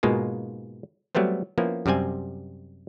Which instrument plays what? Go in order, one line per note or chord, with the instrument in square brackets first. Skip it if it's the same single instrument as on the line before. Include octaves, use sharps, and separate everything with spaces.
[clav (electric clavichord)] G#2 B2 G#3 A#3 F4
F#3 G3 A3 B3 C4
F3 A#3 B3 C#4 E4
F#2 C3 G3 C4 G#5